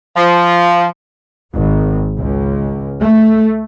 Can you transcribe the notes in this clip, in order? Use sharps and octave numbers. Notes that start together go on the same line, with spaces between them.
F3
G#1
C#2
A3